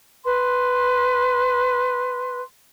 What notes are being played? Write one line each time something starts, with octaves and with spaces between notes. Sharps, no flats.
B4 C6